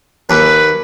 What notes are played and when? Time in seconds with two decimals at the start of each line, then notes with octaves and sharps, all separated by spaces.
0.30 D#2 B4